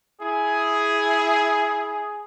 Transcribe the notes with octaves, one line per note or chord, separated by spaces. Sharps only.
E4 G#4